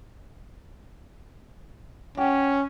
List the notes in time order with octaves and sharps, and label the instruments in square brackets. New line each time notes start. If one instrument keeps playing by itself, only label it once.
[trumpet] C#4 [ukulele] G4 F#5